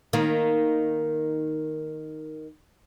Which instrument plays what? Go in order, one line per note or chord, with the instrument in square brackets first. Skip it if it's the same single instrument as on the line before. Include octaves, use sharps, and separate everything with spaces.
[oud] D#3 A#3